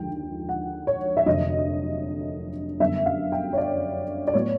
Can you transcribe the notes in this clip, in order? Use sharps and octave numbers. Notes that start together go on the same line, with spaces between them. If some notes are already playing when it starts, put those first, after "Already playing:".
Already playing: D#2 D3 F3 G#3 G5
F#5
C#5
E5
F1 F2 D3 F#3 A#3 D#5
F#2 D3 G3 B3 E5
F5
G5
C#5
D5
D5
A2 F#3 B3 C#5